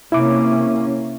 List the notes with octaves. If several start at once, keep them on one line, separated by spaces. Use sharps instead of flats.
C3 A#3 C#4 E4 E5 D6